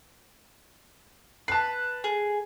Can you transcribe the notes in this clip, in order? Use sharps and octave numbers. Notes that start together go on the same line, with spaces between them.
B4 A5 C7
G#4